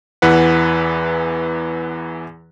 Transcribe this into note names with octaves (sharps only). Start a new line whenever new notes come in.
E2 E3 B4 F#5